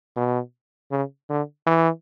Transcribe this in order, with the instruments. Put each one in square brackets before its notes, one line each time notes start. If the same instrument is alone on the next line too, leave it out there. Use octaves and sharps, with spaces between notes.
[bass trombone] B2
C#3
D3
E3